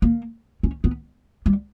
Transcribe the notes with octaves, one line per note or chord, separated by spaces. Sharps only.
A#3
C#4
B3
G3